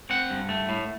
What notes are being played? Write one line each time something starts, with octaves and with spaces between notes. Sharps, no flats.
C4 F#5
G2
A3
A2